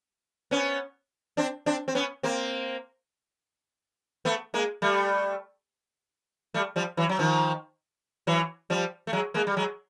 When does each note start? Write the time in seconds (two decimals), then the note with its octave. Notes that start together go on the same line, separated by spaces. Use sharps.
0.51 B3 C#4
1.37 C4 D4
1.66 C4 D4
1.88 C4
1.95 B3 C#4
2.23 A#3 C4
4.25 A3 B3
4.54 G#3 A#3
4.82 G3 A3
6.54 G3 A3
6.76 F3 G3
6.97 E3 F#3
7.09 F#3
7.19 D#3 F3
8.27 E3 F#3
8.70 F3 G3
9.07 A3
9.13 F#3 G#3
9.34 G#3 A#3
9.47 G3
9.57 F#3 G#3